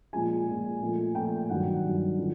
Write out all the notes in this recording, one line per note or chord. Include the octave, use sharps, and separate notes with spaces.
A#2 F3 G#3 G#5
A#2 F3 G#3
A#2 F3 A3
A#2 F3 A3 G5
G2 D#3 F#3 F#5
G2 D#3 F#3
D3 F3